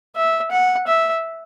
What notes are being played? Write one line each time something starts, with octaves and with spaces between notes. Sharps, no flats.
E5
F#5
E5